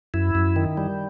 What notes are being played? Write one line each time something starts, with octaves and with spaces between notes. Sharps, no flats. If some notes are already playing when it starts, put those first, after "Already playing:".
F#2 E4
F#2
D#3
G3